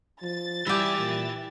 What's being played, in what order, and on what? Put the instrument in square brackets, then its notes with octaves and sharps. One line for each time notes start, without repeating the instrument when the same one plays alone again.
[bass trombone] F3 [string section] A6
[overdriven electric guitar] E3 G#5 [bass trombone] G3 [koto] E4 G4
[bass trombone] A#2